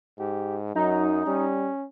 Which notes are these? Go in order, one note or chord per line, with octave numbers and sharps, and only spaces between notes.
G#2 G4
F#2 F#3 D#4
G3 C#4